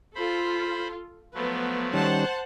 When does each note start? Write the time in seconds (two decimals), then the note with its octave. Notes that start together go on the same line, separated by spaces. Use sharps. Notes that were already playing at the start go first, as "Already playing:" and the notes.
0.15 F4 A4 C5 B5
1.35 F3 F#3 A3 B3 B4
1.93 D#3 G3 C#4 C5 F#5 A5